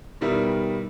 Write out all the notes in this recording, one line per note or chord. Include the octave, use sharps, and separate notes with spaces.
B2 D#3 G3 E4 A#4